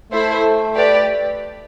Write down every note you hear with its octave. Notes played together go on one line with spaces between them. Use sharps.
A3 E4 A4 C5 E5
G4 B4 D5